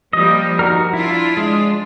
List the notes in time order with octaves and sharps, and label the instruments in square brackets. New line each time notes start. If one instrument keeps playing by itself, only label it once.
[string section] F3 G3 A#3 [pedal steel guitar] D#5
[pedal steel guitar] D#4 F#4 A#4
[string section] F3 D4 F4 [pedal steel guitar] E4
[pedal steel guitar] G#3